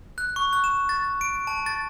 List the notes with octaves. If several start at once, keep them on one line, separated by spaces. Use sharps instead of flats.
F#6
C#6
F#6
E7
A6
D7
A5
A6